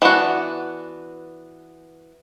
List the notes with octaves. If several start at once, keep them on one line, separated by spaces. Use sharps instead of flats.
E3 B3 D4 F#4